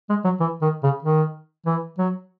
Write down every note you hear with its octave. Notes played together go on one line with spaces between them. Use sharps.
G#3
F#3
E3
D#3
C#3
D#3
E3
F#3